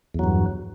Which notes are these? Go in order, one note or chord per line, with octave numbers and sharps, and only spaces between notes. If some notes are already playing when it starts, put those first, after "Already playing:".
E2 G2 F#3